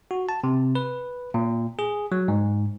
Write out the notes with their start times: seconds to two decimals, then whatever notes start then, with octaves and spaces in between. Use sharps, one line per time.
0.11 F#4
0.29 A5
0.44 C3
0.75 B4
1.34 A#2
1.79 G#4
2.12 F#3
2.28 G#2